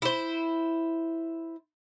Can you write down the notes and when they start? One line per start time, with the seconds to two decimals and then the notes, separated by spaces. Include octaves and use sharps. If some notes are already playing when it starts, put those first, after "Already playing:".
0.02 E4 C5